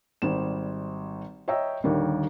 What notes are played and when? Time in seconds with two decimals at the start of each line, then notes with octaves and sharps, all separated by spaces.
0.22 G#1 G3 C5 E7
1.48 C#5 D#5 E5 G5 A#5 E6
1.84 D#2 D3 D#3 G3